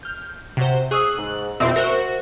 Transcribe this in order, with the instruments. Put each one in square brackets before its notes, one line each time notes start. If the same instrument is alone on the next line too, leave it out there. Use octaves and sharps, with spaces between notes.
[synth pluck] F6 G6
[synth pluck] C3 C5 [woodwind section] F#4
[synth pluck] G#4 C#6 E6 [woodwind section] D#6 [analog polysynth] F#6
[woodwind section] G#2
[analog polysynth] F2 B2 C4 [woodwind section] E5
[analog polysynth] F#4 [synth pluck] A#4 C5